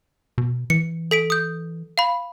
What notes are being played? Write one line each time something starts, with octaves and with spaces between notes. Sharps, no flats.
B2
E3 C#7
A4 B6 D7
D#6 G6
F5 B5